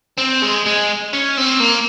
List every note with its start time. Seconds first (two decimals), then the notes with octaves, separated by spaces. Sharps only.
0.18 C4
0.42 G#3
0.66 G#3
1.13 C#4
1.37 C4
1.60 A#3